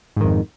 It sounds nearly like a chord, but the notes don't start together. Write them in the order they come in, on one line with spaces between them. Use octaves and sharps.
G#2 D#3 F2